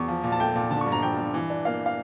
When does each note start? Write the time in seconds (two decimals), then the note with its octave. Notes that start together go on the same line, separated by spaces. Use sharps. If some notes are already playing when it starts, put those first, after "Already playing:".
Already playing: E2 C#6
0.08 F3
0.24 A#2
0.32 A5
0.40 A3 G5
0.55 A#2
0.71 D3 A5
0.81 C#6
0.86 G2
0.92 A#5
1.02 F3 G5
1.18 G2
1.34 E3
1.50 D4
1.65 A#3 F5
1.86 F5